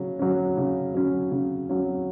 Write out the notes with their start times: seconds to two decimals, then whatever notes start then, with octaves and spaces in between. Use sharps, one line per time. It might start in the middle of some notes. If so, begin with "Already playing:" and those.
Already playing: C#3 F#3 C#4
0.19 F#3 C#4
0.57 C#3
0.94 F#3 C#4
1.32 C#3
1.69 F#3 C#4